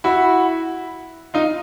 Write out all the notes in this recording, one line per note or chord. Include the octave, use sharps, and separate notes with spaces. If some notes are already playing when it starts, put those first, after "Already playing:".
E4 F#4
D#4 F4